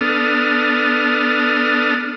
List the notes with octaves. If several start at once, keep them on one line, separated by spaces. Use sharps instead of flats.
B3 D4 A4 D#6 F6